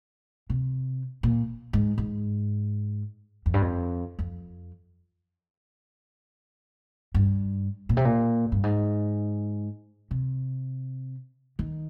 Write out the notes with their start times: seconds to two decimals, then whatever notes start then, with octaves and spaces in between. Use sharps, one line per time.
0.50 C3
1.23 A#2
1.73 G#2
1.98 G#2
3.46 F2
3.54 G2
3.62 F2
4.19 F2
7.14 G2
7.89 A#2
7.97 C3
8.05 A#2
8.52 G2
8.63 G#2
10.11 C3
11.59 D#3